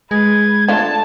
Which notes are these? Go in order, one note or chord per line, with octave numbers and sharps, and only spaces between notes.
G#3 B4 G#6
D3 A3 F4 A5